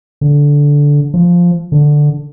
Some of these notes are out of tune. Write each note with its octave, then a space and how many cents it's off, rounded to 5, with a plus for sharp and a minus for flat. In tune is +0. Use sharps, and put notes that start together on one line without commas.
D3 -15
F3 +0
D3 +5